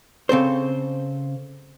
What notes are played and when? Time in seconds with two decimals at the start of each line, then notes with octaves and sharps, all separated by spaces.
0.29 C#3 C4 A4 C5